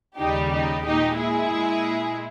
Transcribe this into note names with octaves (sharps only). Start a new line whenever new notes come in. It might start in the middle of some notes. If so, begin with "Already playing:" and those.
D#2 C#3 G3 D#4 G4
D#4 G4
A#2 G#3 D#4 G4
E4 G#4
A#2 G#3